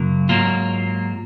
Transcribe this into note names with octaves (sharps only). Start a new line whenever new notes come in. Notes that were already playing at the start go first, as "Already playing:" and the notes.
Already playing: F#2 C#3 F#3 A#3
G#2 F#3 A#3 F4